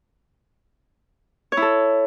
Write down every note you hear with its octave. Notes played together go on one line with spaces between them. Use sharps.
C#5
E4
A4